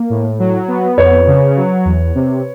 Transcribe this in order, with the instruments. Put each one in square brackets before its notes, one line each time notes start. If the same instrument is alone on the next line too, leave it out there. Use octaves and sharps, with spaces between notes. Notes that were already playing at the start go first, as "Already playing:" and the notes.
Already playing: [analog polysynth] A#3
A2
F#3
B3
[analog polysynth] F2 [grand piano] B4 C#5
[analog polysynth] C#3
F#3
E2
C3